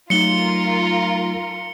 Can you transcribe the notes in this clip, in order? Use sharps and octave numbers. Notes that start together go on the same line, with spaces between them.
F#3 A3 D#4 F4 A#4 C#7 G7